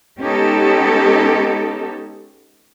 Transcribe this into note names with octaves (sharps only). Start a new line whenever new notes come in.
G#3 B3 C#4 D#4 G4 A4